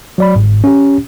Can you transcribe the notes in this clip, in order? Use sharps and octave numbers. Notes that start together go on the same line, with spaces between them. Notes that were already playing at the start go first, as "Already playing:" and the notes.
F#3 D5 B5
G1 G#2
C#4 G4